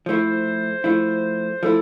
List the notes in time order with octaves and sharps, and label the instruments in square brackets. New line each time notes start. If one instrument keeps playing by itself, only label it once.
[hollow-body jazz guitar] F3 A3 E4 [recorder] C5
[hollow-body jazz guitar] F3 A3 E4
[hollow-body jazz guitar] F3 A3 E4 [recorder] A4